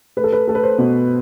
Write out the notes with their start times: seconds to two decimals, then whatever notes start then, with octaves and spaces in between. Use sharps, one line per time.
0.17 A3 B4
0.24 A4
0.33 B4
0.47 A3 A4
0.55 B4
0.63 C5
0.78 B2